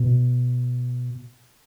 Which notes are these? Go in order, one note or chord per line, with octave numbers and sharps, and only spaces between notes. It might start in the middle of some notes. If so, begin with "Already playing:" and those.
Already playing: B2